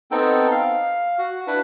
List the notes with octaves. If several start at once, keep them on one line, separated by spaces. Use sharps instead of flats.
B3 C4 D#4 A4 G5
F5
F#4
D4 E4 B4